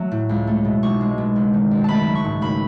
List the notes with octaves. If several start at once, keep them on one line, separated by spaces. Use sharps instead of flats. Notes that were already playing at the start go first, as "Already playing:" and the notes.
Already playing: F#3 A3
A2
C#2
A3
B2
B1 C#6
G#3
B2
F#1
D#3
F#2
A3 A5 B5
F#3
C#6
G#2
F#1 B5